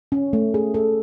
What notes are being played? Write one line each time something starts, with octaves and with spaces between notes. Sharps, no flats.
C#4
A3
G#4
A4